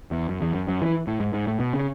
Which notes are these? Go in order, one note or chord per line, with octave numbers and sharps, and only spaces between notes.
E2
F#2
E2
F#2
F#2
E3
A2
G#2
G#2
A2
B2
C#3